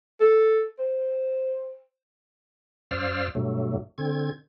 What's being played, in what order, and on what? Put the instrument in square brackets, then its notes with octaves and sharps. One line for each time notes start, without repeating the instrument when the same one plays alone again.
[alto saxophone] A4
C5
[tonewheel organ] F#2 C5 D5 F5 E6 F6
G2 B2 F#3 A3
D3 C4 G#6